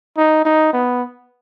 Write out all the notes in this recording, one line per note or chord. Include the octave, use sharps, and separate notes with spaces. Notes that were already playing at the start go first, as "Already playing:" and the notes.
D#4
D#4
B3